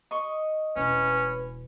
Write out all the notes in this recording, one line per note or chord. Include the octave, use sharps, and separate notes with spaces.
D#5 C#6
E1 C#4 B4